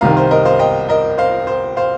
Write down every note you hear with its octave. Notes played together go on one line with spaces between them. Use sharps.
C2 C3 D#3 F5 A#5
C5
A#4 D#5
C5 F5
D#5 G5
A#4 D#5
C5 F5
C5
C5 F5